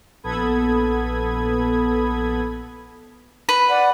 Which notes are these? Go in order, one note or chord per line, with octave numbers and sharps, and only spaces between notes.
A#1 B3 A4 B5 D#6 G#6
B4
D5 F#5